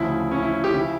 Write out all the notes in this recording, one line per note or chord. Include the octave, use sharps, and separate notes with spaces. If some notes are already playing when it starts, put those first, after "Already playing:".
Already playing: D2 C#3 F3 E4
C#4
E4
G4
C#3 F3 E4